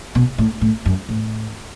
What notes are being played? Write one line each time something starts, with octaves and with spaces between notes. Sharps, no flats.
B2
A2
A2
F#2
A2